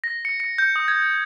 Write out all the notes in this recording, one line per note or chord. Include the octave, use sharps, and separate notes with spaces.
A#6
C#7
C#7
G6
D#6
G#6